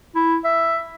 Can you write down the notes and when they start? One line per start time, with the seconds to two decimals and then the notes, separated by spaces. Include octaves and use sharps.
0.15 E4
0.45 E5